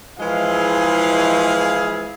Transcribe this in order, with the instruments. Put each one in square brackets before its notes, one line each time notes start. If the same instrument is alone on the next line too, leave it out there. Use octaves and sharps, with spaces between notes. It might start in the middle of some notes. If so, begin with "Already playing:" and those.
[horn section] E3 F3 G#3 [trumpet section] E4 G#4 F5